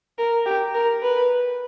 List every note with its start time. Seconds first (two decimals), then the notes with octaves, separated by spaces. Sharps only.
0.18 A#4
0.46 G4
0.74 A#4
1.03 B4